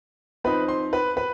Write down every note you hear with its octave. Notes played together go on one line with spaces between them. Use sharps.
F3 C4 D#4 B4 B5
C5 C6
B4 B5
B4 B5